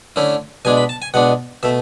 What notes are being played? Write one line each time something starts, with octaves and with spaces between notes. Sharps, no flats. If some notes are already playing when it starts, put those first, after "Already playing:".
D3 A3 C#4 E4
B2 G#3 D4 G#5
B5
A5
G#5
B2 G#3 D4 F#5
B2 A3 E5